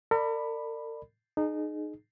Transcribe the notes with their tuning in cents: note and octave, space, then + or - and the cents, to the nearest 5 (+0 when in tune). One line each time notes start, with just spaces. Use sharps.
A#4 -45 D5 +20 B5 +0
D#4 -25 G#4 +25